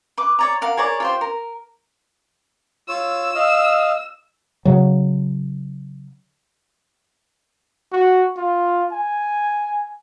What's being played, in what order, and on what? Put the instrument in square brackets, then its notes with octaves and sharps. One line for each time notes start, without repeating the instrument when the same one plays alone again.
[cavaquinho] B4 D6
C#5 D5 A#5
A#4 F5 F#5
G#4 A#4 C#5 D5
F4 G4 C5
A#4
[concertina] F4 C#5 [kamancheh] E6
[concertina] D#5 F5
[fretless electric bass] C#3 F#3
[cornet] F#4
F4
G#5